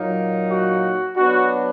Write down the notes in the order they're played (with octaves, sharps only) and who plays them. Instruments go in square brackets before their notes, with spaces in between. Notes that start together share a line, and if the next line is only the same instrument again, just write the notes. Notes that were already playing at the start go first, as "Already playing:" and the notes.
Already playing: [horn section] A#2 F#3 A#3 D#4
F#4
F#3 B3 D4 F#4